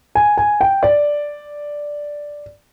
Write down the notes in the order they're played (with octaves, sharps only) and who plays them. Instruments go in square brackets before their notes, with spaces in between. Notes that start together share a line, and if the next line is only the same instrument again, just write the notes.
[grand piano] G#5
G#5
G5
D5